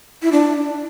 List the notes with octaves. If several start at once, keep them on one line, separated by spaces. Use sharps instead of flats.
E4
D4